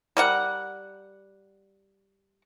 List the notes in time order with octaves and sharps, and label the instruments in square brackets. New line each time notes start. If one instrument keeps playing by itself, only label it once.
[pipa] G3 A#4 F#5